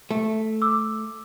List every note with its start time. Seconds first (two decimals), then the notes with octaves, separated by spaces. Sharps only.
0.11 A3
0.62 D6 E6